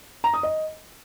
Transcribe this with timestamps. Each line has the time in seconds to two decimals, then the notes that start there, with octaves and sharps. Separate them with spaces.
0.24 A#5
0.34 D#6
0.43 D#5